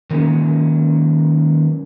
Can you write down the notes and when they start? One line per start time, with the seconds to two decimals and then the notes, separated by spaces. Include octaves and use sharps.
0.10 D#3 F#3 G#3 A#3 C#4